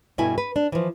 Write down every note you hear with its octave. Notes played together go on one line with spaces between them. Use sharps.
G2 B2 A3 E4 G#5
B4
D4
E3 F3